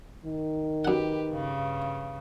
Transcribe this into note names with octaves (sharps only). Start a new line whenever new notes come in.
D#3
F#2 G4 B4 F#5
G2 C#3